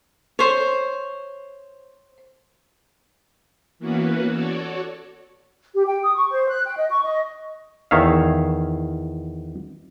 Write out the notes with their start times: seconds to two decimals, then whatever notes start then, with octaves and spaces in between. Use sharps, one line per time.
0.39 C5 C#5
3.79 E3 A#3 B3 C#4 F#4 B4
4.30 F#4 A4 C#5 D5
5.74 G4
5.87 G5
6.03 D#6
6.15 C#6
6.31 C5
6.48 F#6
6.65 G5
6.76 D#5
6.90 C#6
7.04 D#5
7.91 E2 D#3 C#5 E5 F5